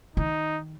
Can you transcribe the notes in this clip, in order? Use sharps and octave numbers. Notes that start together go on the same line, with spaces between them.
D#3 D#4